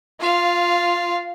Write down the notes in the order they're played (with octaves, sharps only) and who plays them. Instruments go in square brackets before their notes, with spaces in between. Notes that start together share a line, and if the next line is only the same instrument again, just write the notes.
[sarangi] F4 [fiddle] F5